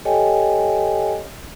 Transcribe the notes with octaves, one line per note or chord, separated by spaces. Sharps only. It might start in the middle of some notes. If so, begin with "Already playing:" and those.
G4 A4 C#5 D#5 G5 G#5